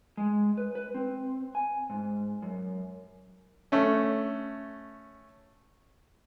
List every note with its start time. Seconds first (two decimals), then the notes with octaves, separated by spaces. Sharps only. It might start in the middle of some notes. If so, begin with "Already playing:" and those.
0.17 G#3
0.58 B4
0.75 B4
0.94 C4
1.55 G#5
1.90 G#2
2.42 F#2
3.72 A3 C#4